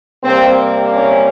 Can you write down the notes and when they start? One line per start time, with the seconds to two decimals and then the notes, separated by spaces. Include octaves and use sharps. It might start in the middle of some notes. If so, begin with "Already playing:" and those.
0.23 C3 G3 A#3 C4
0.90 C#4